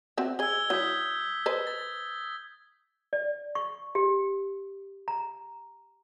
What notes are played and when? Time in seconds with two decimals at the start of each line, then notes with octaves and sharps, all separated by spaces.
0.18 C4 F#4 E5
0.39 G#4 D#5 E6 G#6 G7
0.70 F#3 E4 D#6 G6 B6
1.46 B4 C5 D#5
1.67 A6
3.13 D5
3.55 C#6
3.95 G4
5.08 A#5